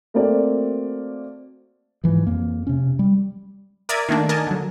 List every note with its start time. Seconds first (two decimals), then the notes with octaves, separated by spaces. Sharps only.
0.14 A3 A#3 C4 F#4 D5
2.04 G#2 E3 F3
2.27 F2 A#3
2.67 C3 C#4
2.99 G3
3.89 A#4 D5 E5 D#6 G#6
4.09 D#3 A3 A#3 D4
4.29 A#4 D5 D#5 G#5 A5
4.47 D3 F#3